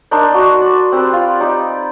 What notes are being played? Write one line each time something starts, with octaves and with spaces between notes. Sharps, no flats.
D4 D#4 A#4 C6
D4 F#4
D5
C4 G4 B4
F4
D#4 G4 D5